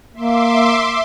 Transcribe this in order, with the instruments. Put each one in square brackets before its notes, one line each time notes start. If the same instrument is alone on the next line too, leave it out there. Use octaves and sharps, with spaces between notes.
[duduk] A#3 [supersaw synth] E5 C6 D6